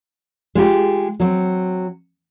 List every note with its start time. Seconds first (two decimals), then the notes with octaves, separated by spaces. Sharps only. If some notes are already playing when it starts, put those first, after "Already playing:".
0.55 G#3 F4 G4
1.20 F#3 C4